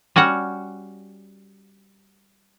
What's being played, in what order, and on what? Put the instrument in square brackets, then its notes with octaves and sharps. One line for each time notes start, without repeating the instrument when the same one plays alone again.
[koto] G3 C#4 F#4 F#5